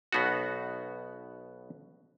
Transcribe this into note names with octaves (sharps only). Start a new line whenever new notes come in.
B1 B2 B3 D#4 F#4